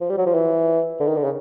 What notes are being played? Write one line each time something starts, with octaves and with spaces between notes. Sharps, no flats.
F3
G3
F#3
F3
E3
D3
D#3
D3
C#3